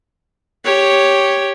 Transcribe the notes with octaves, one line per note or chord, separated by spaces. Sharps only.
G4 C#5